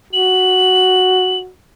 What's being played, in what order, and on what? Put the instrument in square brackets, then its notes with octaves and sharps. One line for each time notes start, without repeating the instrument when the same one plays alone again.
[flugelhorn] F#4 [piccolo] F#7